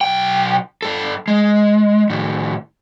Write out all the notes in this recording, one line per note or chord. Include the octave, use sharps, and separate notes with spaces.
B1 G5
G2 A4
G#3
A2 D#3